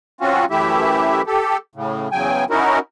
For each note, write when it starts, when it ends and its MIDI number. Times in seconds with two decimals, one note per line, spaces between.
0.21 0.45 54
0.21 0.45 60
0.21 0.45 61
0.21 0.45 65
0.21 0.45 66
0.51 1.22 42
0.51 1.22 52
0.51 1.22 57
0.51 1.22 64
0.51 1.22 67
0.51 1.22 76
1.27 1.57 67
1.27 1.57 69
1.75 2.08 45
1.75 2.08 49
2.12 2.44 40
2.12 2.44 49
2.12 2.44 54
2.12 2.44 79
2.12 2.44 80
2.50 2.79 61
2.50 2.79 63
2.50 2.79 64
2.50 2.79 66
2.50 2.79 70